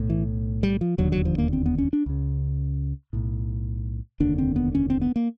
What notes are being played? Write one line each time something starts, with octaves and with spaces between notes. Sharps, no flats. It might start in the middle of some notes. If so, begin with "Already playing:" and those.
Already playing: B1 A2
E3
G3
F3
E1 D#2 D3 F#3
F#3
F3
A#3
C4
B3
C#4
D4
C#2 C#3
B1 A2
F1 D#2 D3 D4
C4
B3
C#4
C4
B3
A#3